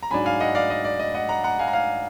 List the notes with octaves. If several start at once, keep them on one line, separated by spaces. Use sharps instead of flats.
A#5
G#2 F#3 D4 G#5 B5
F5 G#5
D#5 F#5
D5 F5
D#5
D5
D#5
D#5 F#5
F#5 A#5
F#5 A#5
F5 G#5
A#5
F5 G#5